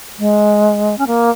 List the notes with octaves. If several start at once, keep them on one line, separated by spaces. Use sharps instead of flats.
G#3
C#4
A#3